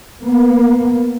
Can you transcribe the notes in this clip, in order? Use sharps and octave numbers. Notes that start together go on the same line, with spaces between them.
A#3 B3